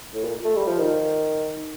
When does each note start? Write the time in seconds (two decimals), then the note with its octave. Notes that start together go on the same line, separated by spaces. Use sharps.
0.14 A2
0.24 A#2
0.45 A3
0.56 G3
0.68 F3
0.79 D#3